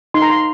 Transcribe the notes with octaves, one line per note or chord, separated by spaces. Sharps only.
D#4 C6
A#5
C6